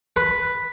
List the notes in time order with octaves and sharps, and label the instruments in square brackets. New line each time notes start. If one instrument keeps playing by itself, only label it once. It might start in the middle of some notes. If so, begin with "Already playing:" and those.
[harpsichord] B4